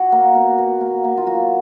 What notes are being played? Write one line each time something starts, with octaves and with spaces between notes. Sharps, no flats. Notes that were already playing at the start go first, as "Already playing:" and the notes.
Already playing: F#4
A#3
B2
B2
A#3
A#3
F4
F#3 F#4